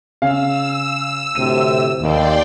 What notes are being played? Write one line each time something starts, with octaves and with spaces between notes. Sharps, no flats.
C#3 F5 E6
D2 A2 C3 D#7
D#2 D5 G5 C6